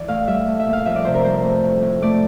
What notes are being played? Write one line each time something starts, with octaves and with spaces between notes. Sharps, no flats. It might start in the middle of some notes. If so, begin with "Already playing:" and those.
Already playing: E3 D5
A2 F5
G3 E5
A3
E5
A#2
F5
F2 E5
D5
C3 C5
A#4
G2 C5
A3
A2
A2
A3 D5